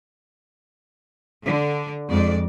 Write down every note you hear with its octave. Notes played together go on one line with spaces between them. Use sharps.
D3
F2 G#3 D5